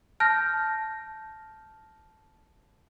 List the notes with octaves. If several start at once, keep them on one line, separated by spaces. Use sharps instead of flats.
A5 F6 G6 A#6